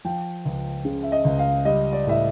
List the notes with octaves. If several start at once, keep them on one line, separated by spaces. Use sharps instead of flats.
F3 G5
C#2
C#3
E5
D#5
C#2
F5
G3 D#5
D5
A2 E5